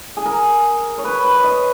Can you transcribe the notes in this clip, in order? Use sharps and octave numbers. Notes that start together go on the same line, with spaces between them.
G#4
A#4
C#5
B4
B4
C#5
D#5